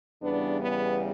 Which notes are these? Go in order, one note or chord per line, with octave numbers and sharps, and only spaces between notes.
E2 C#3 G3 B3 D4
B3